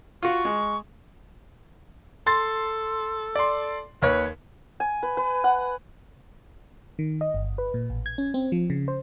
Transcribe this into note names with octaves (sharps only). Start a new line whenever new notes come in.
F4 F#4 C#6
G#3
A4 C6 A6
D5 C6
D#2 B4 C#5
G#5
B4
B4
F#5
D#3
D#5
G1
B4
A#2
A1
G#6
C#4
C4
F3
C#3
C5